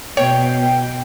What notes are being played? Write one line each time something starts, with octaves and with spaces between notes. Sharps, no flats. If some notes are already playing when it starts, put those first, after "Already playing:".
B2 C#5 G5